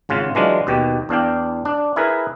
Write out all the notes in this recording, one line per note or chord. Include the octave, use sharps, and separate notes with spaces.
G#1 C#3 F4 F#5
E3 F#3 G#3 D4 F4
D#2 B2 G4
E2 D4 F5 G5
D4
E4 G#4 A#4 B4